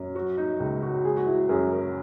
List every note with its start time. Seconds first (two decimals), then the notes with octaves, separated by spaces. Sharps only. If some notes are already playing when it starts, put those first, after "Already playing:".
Already playing: F#2
0.15 F#3 F#4
0.37 D#4
0.60 C#2
0.82 F#4
1.05 G#3 G#4
1.17 F#4
1.26 E4
1.49 F#2 G#4
1.72 A#4